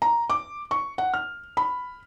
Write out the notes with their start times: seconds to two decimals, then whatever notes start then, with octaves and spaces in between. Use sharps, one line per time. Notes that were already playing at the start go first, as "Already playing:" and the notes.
0.02 A#5
0.30 D6
0.71 C#6
0.98 F#5
1.14 F6
1.57 B5